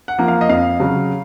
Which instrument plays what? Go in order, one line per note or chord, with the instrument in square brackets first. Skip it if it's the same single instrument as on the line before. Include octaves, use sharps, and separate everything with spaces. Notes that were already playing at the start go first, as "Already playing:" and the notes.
[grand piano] F#5
F3 A#3
F5
D#5
F2 F5
C#3 F#3